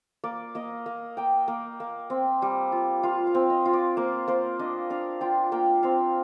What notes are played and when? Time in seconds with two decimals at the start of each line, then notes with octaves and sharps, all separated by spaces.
0.24 A#3 D5
0.55 A#3 D#5
0.86 A#3
1.17 A#3 G5
1.48 A#3
1.80 A#3
2.10 C4
2.42 G3
2.72 F4
3.03 F4 F5
3.27 F5
3.35 C4
3.50 D#5
3.65 F4
3.73 D5
3.97 A#3 C5
4.27 A#3 C5
4.59 D4 D#5
4.90 D4 F5
5.21 F4 G5
5.52 A#3 G5
5.83 C4 F5